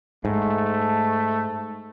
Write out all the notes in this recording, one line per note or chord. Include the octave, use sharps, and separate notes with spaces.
G#2 A3